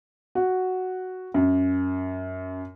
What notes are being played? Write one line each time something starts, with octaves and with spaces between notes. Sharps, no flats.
F#4
F#2